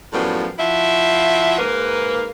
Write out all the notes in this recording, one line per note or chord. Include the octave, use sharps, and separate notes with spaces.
F#2 A2 F3 G3 B3 F#4
F3 E4 F#4 E5
G#2 A#3 B4